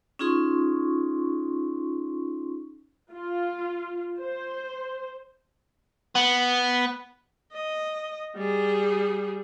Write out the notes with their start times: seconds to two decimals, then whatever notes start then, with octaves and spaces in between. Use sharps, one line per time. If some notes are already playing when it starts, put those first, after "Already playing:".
0.19 C#4 D#4 F4 G#4 C6 C#6
3.12 F4
4.19 C5
6.15 B3
7.53 D#5
8.36 G3 G#4